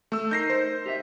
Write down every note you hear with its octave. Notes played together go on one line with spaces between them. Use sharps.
A3 E6
D#4 A#4 G6 A#6 C7
C5
G4 D#5 E5